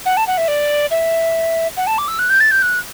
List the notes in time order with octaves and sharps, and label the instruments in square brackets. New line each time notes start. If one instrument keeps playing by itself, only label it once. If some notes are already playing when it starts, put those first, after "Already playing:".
[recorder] F#5
A5
F#5
E5
D5
E5
F#5
A5
D6
E6
F#6
G6
A6
G6
F#6